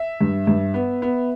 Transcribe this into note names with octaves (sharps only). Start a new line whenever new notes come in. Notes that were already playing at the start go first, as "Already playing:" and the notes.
Already playing: E5
G2
G2
B3
B3